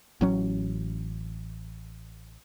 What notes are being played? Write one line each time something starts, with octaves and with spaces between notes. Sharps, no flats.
A1 F#3 C#4